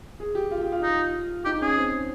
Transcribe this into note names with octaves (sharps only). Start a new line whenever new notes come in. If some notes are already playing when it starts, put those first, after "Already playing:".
G#4
G4
F4
G4
F4
D#4
D#4 G4
C#4 G#4
C4